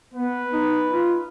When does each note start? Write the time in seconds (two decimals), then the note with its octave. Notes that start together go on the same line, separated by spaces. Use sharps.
0.14 B3 B4
0.53 D#4
0.90 F4